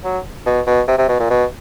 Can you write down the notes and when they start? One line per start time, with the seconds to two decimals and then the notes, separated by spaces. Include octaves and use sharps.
0.04 F#3
0.46 B2
0.67 B2
0.88 C3
0.98 C3
1.09 B2
1.20 A#2
1.30 B2